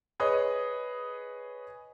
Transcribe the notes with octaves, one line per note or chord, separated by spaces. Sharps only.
G#4 B4 C#5 D#5